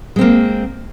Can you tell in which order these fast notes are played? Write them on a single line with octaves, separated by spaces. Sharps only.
G#3 C4 A#3